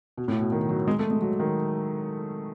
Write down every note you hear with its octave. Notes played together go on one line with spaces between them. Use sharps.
B2
A2
B2
D#3
F#3
G#3
A3
G#3
F#3
D#3